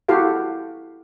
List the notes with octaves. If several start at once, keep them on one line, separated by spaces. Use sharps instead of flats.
E4 F#4 G4 A4 F5